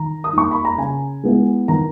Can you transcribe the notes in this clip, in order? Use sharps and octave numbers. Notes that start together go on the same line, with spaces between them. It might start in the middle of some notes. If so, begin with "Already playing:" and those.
Already playing: D#3 A#5
D#6
A#3 D#4 C#6
B5
A#5
C#3 G#5
G#3 B3 E4
D#3 A#5